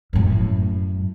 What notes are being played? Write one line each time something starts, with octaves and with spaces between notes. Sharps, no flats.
F#2 A2